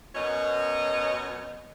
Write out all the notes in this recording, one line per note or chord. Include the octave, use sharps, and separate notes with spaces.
F#2 B2 C#5 D#5